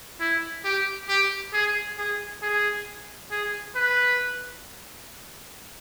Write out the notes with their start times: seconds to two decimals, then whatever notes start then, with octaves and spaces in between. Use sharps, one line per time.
0.21 E4
0.65 G4
1.09 G4
1.53 G#4
1.98 G#4
2.42 G#4
3.31 G#4
3.75 B4